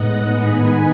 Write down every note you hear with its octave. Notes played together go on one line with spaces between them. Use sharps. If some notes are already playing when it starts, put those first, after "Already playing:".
Already playing: A2 G#3 B3 D#4 D#5 F#5
G#2 D#3 G#3 B3 D#4 G#5 B5